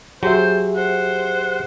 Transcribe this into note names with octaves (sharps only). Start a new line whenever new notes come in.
F#3 G4 G#4 C5 E5
C5 F#5